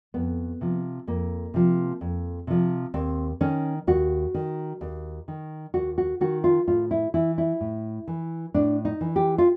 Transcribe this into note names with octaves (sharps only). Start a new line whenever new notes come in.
F2 B3
C3 F3
F2 A#3
C3 F3
F2
C3 F3
D#2 C4
D#3 C#4
D#2 F#4
D#3
D#2
D#3
D#2 F#4
F#4
D#3 F#4
F4
A2 F4
E4
E3 E4
E4
A2
E3
A2 D4
D#4
E3
G4
F4